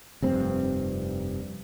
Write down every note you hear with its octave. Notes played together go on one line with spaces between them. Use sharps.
F1 G2 C4